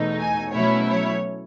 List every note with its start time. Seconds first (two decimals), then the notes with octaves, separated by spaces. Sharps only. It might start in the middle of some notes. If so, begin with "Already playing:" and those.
Already playing: E2 B2 A3 D#4
0.19 G#5
0.53 B2 F#3 A3 C#4 E4 C#5
0.87 C#5